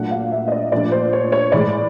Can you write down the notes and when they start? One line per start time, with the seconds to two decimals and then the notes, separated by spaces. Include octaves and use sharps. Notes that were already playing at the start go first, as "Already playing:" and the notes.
Already playing: A#2 F#3 A3 D4 F#5
0.11 F5
0.32 E5
0.48 D#5
0.52 D5
0.72 A#2 F3 A3 D4 D5
0.92 C5
1.13 C#5
1.32 C#5
1.52 A2 E3 G#3 D5